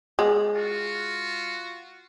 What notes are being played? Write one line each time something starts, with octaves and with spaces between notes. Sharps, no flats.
G#3
F4 F#4